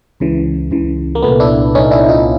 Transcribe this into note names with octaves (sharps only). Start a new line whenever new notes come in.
C#2 C#3 E3
C#2 C#3 E3
A#3
C2 A#2 A3 B3
D4 E4
C2 A#2 C#4 D#4
D4 E4
D#4 F4